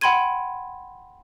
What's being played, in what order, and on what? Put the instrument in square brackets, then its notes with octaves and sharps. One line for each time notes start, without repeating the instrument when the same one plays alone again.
[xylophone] F#5 G5 B5 C6 G#6 D#7